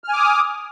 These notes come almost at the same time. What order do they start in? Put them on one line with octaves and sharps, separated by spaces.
F6 G#5 D6 D#6